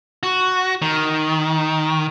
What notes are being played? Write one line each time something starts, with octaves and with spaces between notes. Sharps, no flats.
F#4
D#3